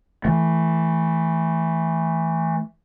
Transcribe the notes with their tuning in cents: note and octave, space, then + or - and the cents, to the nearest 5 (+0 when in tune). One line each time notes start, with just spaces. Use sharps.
E3 +0 A3 +0